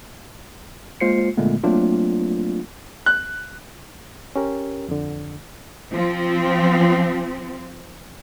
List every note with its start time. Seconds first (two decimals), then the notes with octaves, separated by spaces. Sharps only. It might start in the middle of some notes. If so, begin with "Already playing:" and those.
1.00 G#3 A#3 F4 C5 C7 C#7
1.37 A#2 D3 G#3 A3 B3
1.64 F#3 A3 A#3 C4 D4 F4
3.06 F#6
4.36 C#4 G4 A#4
4.89 F2 D3
5.92 F3 C4